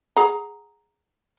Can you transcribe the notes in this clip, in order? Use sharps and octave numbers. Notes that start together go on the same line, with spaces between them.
G#4 F#5 A#5